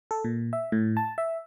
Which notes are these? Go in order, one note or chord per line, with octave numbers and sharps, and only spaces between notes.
A4
A#2
E5
A2
A5
E5